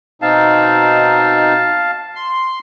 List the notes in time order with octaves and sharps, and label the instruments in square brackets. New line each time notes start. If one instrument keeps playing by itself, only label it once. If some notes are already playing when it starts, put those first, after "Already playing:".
[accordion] B2 C4 D#4 [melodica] F5 A5
[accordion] C6